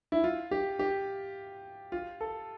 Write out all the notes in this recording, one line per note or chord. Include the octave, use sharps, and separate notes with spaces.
E4
F4
G4
G4
F4
A4